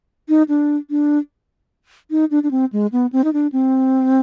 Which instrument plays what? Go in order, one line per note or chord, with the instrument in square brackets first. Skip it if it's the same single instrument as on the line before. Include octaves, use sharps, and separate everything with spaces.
[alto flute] D#4
D4
D4
D#4
D4
D4
C4
G#3
B3
C4
D#4
D4
C4